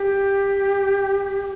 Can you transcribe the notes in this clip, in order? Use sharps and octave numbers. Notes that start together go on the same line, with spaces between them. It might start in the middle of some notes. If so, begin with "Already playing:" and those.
Already playing: G4